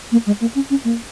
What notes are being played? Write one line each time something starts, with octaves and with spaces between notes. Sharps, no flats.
A#3
G#3
A#3
C#4
C#4
A#3